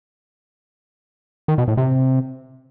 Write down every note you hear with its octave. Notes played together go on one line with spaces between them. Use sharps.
D#3
B2
A2
C3